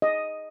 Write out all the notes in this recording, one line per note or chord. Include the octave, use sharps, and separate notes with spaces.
D#5